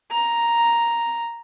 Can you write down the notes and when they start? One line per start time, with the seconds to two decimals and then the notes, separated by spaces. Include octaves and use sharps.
0.11 A#5